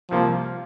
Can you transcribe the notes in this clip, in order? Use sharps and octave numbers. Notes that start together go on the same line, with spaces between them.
C2 C3 F3 G3 A#3